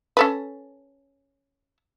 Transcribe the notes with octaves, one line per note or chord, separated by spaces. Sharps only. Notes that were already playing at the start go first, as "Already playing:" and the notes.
C#4 A4 B4